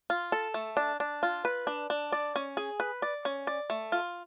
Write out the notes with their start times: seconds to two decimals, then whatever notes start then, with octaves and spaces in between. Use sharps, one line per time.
0.10 F4
0.32 A4
0.54 A3
0.77 D4
1.00 D4
1.23 F4
1.45 B4
1.67 D4
1.90 D4
2.12 D5
2.36 C#4
2.57 G#4
2.80 B4
3.02 D5
3.25 C#4
3.47 D5
3.70 A3
3.92 F4